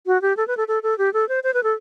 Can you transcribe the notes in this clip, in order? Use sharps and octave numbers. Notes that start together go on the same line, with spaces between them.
F#4
G4
A4
B4
A4
A4
A4
G4
A4
C5
C5
B4
A4